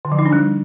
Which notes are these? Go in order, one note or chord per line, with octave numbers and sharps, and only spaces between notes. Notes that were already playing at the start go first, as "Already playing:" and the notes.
D3
F3
D#4
D4
G3